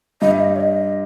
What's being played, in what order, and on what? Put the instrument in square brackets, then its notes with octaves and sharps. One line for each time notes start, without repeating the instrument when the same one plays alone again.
[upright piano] G2 [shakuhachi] D#5
[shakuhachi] E5
D#5
C#5
D#5